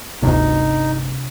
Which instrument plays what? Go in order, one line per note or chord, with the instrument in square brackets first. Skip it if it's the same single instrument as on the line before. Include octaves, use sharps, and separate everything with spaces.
[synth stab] G1 D2 [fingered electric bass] C3 D4 [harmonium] D#4